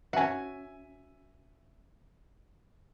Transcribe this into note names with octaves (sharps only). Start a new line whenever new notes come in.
C#4 F#4 E5 G#5